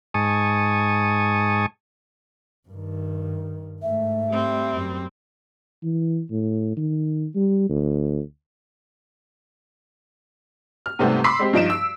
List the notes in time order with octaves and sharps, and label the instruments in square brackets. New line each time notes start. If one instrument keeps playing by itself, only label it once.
[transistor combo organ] G#2 G#5 A5 C#6 D#6
[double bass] G2 D#3
[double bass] G#2 A3 [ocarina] E5
[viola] G3 C4
[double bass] F#2
[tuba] E3
A2
D#3
G3
D2
[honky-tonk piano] F6
G#2 C3 G3 A3 B3 C4
B5 C6 D6 E6 B6 C7
G#3 C4 G4
G2 F3 D#4 D7 E7
E6